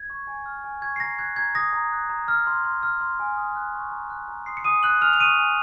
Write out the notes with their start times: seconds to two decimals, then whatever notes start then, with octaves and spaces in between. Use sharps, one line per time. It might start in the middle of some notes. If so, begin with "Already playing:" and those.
Already playing: G#6
0.10 C#6
0.27 G#5
0.46 F6
0.64 G#5
0.82 C#6 G#6
0.96 C7
1.00 A#5 A#6
1.19 F#6 G#6
1.36 A#5 G#6
1.55 D#6 A#6
1.73 A#5
1.92 F#6
2.10 A#5
2.28 F6
2.47 C6
2.64 C6
2.83 F6
3.01 C6
3.20 G#5
3.37 D#6
3.56 F#6
3.74 C#6
3.92 A#5
4.10 F#6
4.28 A#5
4.46 C6 D#6 C7
4.57 C#7
4.64 G#5 D#6 D#7
4.83 F#6 F#7
5.01 G#5 F6 F7
5.13 F7
5.20 C#6 D#6 D#7
5.38 G#5